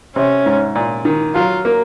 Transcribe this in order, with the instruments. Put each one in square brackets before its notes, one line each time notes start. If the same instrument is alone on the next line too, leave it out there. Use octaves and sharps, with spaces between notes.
[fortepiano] C3 [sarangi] C#4
[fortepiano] G#2
A#2
D#3
[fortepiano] F#3 [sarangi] F4
[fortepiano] A#3